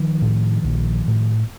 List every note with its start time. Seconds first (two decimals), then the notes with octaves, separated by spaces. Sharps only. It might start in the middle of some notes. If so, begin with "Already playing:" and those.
Already playing: D#3 F3
0.22 A2
0.64 A#1
1.08 A2